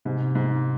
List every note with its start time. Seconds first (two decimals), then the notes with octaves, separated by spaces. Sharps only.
0.05 G#2 C3
0.35 G#2